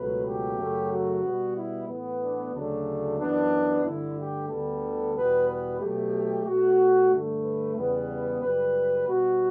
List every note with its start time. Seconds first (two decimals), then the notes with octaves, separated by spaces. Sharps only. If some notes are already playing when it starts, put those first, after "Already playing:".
Already playing: C#2 B2 F#3 A3 B4
0.24 G4
0.57 F#2 C#3 F#3 A3
0.90 F#4
1.23 B2 G3 B3
1.55 E4
1.88 A2 E3 B3
2.21 D4
2.53 D2 C#3 F#3 A3 D4
3.18 F#2 E3 B3 D4
3.84 G2 D3 A3 E4
4.17 G4
4.49 D2 D3 G3 B3 A4
5.15 E2 B2 G3 B3 B4
5.47 B4
5.80 B2 F#3 A3 G4
6.45 B2 A3 F#4
7.11 G2 D3 A3
7.44 B4
7.76 E2 C#3 G3 B3
8.41 F#2 C#3 G3 B4
9.06 B2 G3 B3 F#4